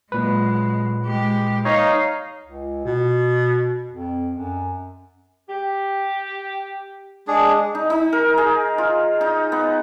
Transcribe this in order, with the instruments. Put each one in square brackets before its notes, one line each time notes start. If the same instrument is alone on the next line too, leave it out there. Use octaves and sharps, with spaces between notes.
[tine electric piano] A#2 B4 [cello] F#3 G#3
[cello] G#3 G4
[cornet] D#4 [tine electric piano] C#5 [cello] F5
[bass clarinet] C#2
B2
F2
F#2
[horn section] G4
[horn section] G#3 [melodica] D4 G#4
[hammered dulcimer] D#4
D#4
A#4
G#4
F4
D#4
B3